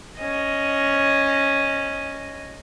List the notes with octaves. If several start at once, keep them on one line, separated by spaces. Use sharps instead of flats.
C#4 D#5